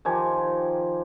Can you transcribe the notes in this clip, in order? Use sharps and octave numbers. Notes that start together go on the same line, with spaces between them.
D#3 F3 G4 G#5